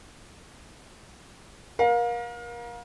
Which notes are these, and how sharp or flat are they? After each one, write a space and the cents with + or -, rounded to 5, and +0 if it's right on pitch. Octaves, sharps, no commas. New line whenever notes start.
A#4 +30 F5 +30